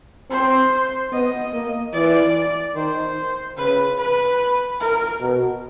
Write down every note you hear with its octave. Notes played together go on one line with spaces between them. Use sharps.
C4 C5
B3 D#5
A#3
E3 D5
D#3 C5
C#3 B4
B4
A#4
B2